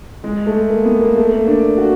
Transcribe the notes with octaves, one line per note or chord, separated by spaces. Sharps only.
G#3
A3
A#3
B3
A#3
A3
A#3
D4
F#4